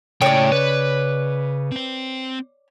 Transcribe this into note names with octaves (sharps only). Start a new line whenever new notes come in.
A2 C#3 C#5 D5 G5
B4
C4 C5